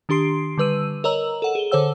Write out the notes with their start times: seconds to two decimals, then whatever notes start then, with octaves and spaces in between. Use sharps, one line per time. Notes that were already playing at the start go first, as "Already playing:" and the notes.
0.09 D#3 D4 G4 C6 C7 D7
0.58 D3 G3 B4 E6 D#7
1.04 A#4 C#5 D#5 A#5 E6 F#7
1.42 A4 F#5 E7
1.55 G#4 G7
1.71 D3 A4 C5 C#5 F#5 E6